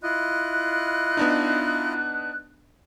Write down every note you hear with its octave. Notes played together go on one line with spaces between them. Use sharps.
E4 F4 D#5 F#6
B3 D4 D#4